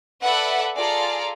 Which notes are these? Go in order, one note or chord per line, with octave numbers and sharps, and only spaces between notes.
A4 B4 D5 E5 F#5
F4 G#4 A4 D5 A#5